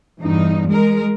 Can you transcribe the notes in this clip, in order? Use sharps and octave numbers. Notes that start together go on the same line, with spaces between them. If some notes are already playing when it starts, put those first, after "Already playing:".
E2 G2 D#4
G#3 A#4